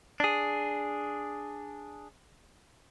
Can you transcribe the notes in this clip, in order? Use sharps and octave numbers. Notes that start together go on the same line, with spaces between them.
D4 G#4